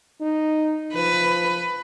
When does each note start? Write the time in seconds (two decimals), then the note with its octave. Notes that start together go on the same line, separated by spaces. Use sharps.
0.21 D#4
0.95 F3 B4